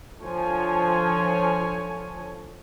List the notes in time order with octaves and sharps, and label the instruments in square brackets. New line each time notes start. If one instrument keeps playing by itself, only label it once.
[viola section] D3 F3 C#5 G#5